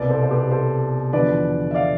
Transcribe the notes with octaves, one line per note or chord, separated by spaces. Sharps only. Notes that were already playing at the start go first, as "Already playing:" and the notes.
Already playing: C2 B2 B4 D5
A4 C5
C5
G4 B4
A4 C5
E2 D3 F3 B4 D5
E5
D5 F5